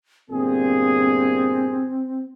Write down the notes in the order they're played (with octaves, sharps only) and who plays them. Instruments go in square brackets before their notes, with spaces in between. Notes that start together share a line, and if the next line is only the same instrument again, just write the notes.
[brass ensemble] G1 A#2 G#4 [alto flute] C4